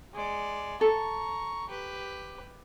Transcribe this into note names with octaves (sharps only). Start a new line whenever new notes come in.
G#3 D5
A4 A#5 C#6
G4 B4